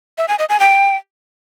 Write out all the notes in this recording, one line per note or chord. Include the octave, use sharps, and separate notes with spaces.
E5
G#5
D#5
G#5
G5